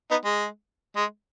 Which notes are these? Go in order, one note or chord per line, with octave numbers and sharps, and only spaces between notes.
B3 D#4
G#3
G#3